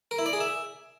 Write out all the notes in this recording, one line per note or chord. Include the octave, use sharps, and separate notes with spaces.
A#4
E4
D5
G#4
E5